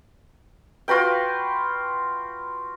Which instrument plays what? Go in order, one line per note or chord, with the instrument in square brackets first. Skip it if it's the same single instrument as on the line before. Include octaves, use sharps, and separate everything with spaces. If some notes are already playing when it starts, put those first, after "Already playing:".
[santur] F4 F#4 B4 G5